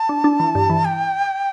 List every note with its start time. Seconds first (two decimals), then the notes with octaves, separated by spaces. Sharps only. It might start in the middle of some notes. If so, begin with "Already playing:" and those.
Already playing: A5
0.09 D4
0.24 D4
0.40 E3
0.55 G2
0.70 E3
0.85 G5